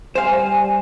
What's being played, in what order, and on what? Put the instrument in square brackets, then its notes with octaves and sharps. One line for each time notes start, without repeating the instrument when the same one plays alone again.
[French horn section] G3 [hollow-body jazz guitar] C5 F5 [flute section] G#5